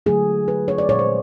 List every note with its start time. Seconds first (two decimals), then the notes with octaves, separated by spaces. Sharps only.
0.06 D3 F#3 A3 G#4
0.48 B4
0.68 C#5
0.78 D5
0.89 A#2 F3 G#3 C#5
0.99 C5